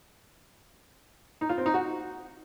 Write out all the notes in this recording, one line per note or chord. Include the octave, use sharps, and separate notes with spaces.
D#4
F4
C4
D#4
F#4